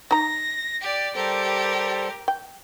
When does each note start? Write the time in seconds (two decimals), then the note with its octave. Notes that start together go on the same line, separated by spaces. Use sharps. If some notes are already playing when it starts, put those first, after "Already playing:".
0.11 D#4 A#5 A#6
0.81 G4 D5
1.16 G3 G4 A4 A#4 C5
2.28 G5